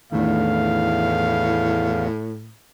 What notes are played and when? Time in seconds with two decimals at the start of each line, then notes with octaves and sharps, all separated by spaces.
0.12 E2 A2 D#3 A3 D4 F5